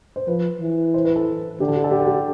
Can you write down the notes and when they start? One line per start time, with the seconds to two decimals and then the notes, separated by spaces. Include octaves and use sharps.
0.16 C5
0.27 F3 B4
0.61 E3
0.94 C5
1.05 B4
1.16 A4
1.60 D3 G4
1.68 A4
1.76 G4
1.84 A4
1.91 G4
2.00 A4
2.07 G4